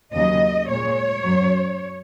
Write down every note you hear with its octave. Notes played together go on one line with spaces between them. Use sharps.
D#2 C#3 F#3 D#5
A#2 G#3 C#5
F#2 F#3